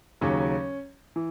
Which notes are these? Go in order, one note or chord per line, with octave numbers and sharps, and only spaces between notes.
D#2 C#3 F#3 C#4
E3